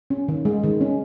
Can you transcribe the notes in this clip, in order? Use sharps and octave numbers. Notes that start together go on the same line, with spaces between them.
C#4
D#3
G#3
D#3
C#4